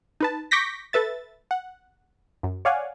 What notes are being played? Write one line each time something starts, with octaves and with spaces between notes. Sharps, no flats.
D#4 B4 A5
C#6 D6 G6 A#6 B6
A4 B4 E5 A6
F#5
F#2
C#5 D5 F5 F#5 G#5